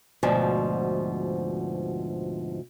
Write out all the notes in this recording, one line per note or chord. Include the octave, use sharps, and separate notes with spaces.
D2 G#2 B2 F3